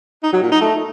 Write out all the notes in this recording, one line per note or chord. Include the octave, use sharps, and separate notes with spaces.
D#4
F#3
A#2
D#4
A3